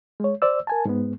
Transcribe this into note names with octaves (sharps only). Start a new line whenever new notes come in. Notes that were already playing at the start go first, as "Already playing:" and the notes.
G#3 C#5
C5 D5 E6
A#4 G#5 A5
G#2 G#3 B3